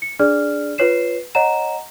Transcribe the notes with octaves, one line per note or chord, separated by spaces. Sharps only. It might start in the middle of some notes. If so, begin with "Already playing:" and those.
C#7
D4 G#4 D5 F6
F4 B4 C#5 C7 E7
C#5 D#5 F#5 A#5 E7